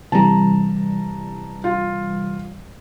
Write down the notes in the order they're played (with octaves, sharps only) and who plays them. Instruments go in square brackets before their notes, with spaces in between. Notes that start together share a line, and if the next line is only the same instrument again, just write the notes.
[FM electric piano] C3 E3 G3 [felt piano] A5 A#5
[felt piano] F4